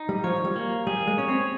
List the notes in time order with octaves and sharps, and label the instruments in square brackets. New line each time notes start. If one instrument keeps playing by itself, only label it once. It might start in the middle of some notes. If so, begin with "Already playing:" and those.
Already playing: [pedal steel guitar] D#4
[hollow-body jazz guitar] G3
[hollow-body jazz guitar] F3 [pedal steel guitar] C#5
[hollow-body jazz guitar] G3
[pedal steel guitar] A#3
[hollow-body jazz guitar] G3 [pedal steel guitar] G#4
[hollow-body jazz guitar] G#3
[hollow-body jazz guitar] C#4 [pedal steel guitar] C#5
[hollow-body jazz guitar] C4